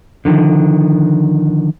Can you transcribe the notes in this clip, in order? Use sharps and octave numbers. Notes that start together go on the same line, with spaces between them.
D3 D#3 F3